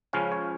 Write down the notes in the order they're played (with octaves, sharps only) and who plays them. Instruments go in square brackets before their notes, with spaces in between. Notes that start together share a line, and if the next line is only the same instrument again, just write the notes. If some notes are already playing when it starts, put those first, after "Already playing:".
[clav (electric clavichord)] C#2 C#3 F3 C#4 F5
C#5